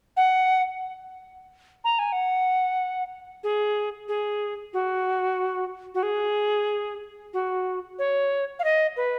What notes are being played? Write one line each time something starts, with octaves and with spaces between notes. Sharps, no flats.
F#5
A#5
G#5
F#5
G#4
G#4
F#4
F#4
G#4
F#4
C#5
F5
D#5
B4